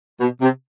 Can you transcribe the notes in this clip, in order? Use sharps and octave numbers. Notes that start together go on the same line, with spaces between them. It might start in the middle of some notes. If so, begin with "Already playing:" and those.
B2
C3